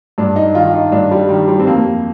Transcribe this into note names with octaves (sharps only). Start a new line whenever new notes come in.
G2 D4
D#4
D#3 F4
D#4
G2 D4
G3
D#3 G3
G3
C4
F2 A#3